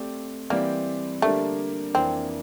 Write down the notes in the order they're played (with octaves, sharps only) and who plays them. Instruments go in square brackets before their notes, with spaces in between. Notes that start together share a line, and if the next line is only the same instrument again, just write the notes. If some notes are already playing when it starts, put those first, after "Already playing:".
Already playing: [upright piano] A3 C4 G4 D5
[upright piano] E3 G3 C4 G4 D5 [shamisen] A#3
[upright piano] D3 G3 A#3 D4 G4 [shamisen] A3
[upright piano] F2 E3 A#3 D4 [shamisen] C4